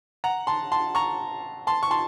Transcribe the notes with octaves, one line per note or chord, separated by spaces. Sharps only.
F#5 A#5
A5 C6
A5 C6
A#5 C#6
A5 C6
C#6
A5 C6